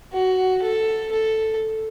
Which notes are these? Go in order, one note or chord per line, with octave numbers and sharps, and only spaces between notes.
F#4
A4
A4